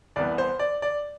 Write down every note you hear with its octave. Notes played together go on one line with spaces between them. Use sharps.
C2 C3 E3 B3 D5
C5
D5
D5